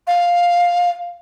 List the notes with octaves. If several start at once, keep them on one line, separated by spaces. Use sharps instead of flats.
F5